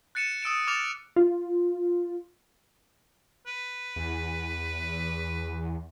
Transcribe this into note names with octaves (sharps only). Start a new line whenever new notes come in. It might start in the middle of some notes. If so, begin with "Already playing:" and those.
F#6 A6 C#7 D#7 E7
D#6 E6 D7 E7
D6 F6 A6 E7 F7
F4
B4
E2